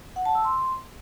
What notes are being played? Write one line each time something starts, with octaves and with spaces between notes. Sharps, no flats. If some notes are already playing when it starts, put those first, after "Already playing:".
F#5
A5
E6
C6